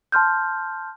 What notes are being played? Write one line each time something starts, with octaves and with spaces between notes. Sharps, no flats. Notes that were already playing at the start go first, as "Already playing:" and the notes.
A5 C6 F6 G6